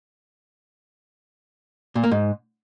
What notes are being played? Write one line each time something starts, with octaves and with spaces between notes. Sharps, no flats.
A#2
A#3
G#2